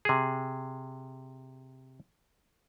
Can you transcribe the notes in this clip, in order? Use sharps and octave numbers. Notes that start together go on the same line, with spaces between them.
C3 G#4